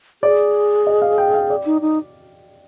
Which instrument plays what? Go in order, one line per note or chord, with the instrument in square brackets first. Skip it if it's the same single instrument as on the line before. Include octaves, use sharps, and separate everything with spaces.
[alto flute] G#4 [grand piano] D5
[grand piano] D#5
F5
G5
F5
D5
[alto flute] D#4
D#4